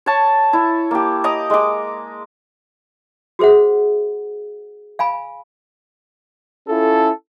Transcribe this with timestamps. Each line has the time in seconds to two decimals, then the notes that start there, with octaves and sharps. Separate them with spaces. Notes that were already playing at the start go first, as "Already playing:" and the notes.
0.06 C#5 A5
0.53 E4
0.91 A#3 G4
1.24 D#5 A#5 D6 D#6
1.50 G#3 D6
3.39 F#4 G#4 C5 E5 F#5
4.99 F5 G#5 B5
6.68 C#4 E4 F4 A4